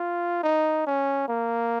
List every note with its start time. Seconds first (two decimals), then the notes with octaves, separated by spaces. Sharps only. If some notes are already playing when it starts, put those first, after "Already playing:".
Already playing: F4
0.43 D#4
0.86 C#4
1.28 A#3